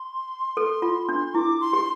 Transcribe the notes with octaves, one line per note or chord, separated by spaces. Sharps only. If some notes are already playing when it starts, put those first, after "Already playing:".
Already playing: C6
A4
F4
D4
E4 D6
C6
G4